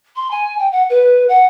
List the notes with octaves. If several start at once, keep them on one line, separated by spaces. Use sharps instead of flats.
C6
G#5
G5
F#5
B4
F#5